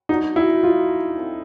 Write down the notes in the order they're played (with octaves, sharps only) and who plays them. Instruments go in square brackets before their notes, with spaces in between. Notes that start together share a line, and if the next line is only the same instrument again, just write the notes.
[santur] F#3 B3 D4 F#4 [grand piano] D#4
[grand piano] E4
F4
[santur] C4 F4 A4